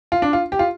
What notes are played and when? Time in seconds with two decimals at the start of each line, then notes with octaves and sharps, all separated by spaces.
0.12 F4
0.22 D4
0.33 F4
0.52 G4
0.59 F4